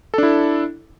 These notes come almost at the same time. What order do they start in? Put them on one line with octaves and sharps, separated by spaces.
A4 D4 E4